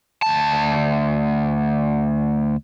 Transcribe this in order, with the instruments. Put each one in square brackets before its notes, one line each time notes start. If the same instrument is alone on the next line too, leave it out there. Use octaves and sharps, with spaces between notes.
[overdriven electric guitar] D2 A5